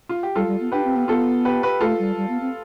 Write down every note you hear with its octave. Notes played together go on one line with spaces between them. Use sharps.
F4
G4
G3 F4 A4
G3
B3
D4 G4 B4
C4
B3
B3 F4 A4
G4 B4
G4 B4
A3 F4 A4
G3
G3
B3
C4